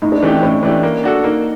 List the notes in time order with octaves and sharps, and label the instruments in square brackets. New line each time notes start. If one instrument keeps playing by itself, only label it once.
[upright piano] A2 [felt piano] D#4
[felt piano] D4
[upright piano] E3 A3 D4 G4 [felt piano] C#4
[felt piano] C4
[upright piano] A2 [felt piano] C#4
[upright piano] E3 A3 D4 G4
A#3
D4 F#4 A4
[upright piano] A#3 [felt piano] D#4